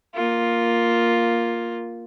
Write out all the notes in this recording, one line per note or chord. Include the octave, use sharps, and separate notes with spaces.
A#3 F4